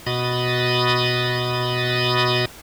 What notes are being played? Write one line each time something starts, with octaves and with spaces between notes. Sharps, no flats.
B2 F#4 D#5 B5 D#6 A6